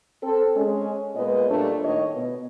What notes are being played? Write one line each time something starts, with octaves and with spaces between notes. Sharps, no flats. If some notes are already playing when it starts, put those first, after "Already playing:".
C4 A4
G#3 C#4
A#2 G#3 B3 B4 C#5 D#5
A#2 G3 A3 D4
A2 D#3 C#5 D#5
B2